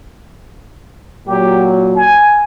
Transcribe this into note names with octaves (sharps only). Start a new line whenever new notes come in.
A#2 F#3 G4
G#5